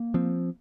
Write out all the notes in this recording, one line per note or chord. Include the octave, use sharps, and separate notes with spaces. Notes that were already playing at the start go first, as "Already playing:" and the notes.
Already playing: A#3
F3 C4